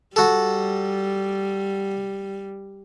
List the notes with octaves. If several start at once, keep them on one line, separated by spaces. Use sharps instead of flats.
G3 F#4 A4